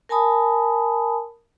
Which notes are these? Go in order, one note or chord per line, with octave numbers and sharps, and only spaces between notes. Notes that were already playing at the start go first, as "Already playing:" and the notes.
A#4 G#5 A5 B5 D#6